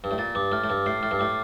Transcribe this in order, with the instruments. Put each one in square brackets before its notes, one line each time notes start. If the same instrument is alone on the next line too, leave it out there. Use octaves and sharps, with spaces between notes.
[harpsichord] G2
A2
[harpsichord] A#2 [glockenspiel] A6
[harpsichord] G2 [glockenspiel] D6
[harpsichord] A2 [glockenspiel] F6
[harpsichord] A2
[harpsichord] G2 [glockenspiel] D6
[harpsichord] A2 [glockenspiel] C7
[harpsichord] A2 [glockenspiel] F6
[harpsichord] G2
[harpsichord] A2 [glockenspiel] D6